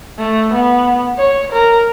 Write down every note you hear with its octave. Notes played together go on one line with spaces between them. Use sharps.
A3
B3
C#5
A#4